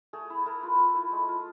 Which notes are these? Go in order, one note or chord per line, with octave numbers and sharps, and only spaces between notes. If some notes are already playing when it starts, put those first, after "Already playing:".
A3 G#4
E4
A3 A#4
F4 B4
A3
E4
G#3 A4
F4